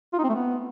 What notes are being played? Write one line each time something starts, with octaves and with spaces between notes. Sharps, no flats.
F4
D#4
C4
A3
B3